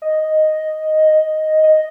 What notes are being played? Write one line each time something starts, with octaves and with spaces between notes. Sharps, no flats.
D#5
D#5